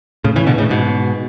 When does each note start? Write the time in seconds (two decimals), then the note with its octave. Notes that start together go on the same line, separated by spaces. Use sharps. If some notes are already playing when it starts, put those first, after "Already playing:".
0.24 A2 C#3
0.36 C#3 E3
0.47 B2 D3
0.58 A2 C#3
0.70 G#2 B2